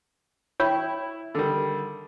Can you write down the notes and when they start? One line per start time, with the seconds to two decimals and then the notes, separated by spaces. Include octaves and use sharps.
0.60 E4 C#5 G5 B5
1.35 D3 D#3 G3